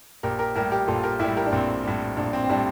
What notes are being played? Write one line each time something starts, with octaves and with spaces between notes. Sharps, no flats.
A#1 G4 A#4
G4 A#4
A2 G3 G4 A#4
G4 A#4
A#1 F4 A4
G4 A#4
A2 G3 E4 G4
G4 A#4
D4
A#1 C4
A2 G3
A#1 D4
C4
C4
A2 G3 D4